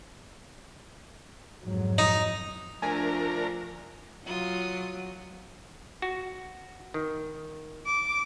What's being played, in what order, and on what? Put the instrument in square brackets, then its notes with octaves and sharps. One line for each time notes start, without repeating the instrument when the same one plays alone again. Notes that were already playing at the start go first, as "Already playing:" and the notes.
[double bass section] F2 G#2 F#3
[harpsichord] D#4
[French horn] F3 [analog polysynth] A3 D4 [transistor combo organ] A#4 [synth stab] G#5
[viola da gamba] F#3 [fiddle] F4 D#6
[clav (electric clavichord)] F#4
D#3
[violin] D6